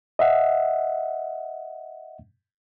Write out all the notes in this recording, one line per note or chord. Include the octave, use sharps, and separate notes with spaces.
D#5 E5 F#5